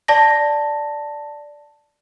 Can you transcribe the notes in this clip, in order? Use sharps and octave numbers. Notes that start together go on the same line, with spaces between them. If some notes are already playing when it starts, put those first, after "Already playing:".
D5 A5 A#6